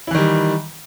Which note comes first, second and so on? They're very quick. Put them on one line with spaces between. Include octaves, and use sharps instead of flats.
E4 E3 D#3 G3